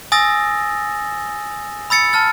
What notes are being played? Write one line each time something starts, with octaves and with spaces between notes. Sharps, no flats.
G#5 D#6 E6 A6 A#6
B5 E6 A6 C#7
A5 F6 A6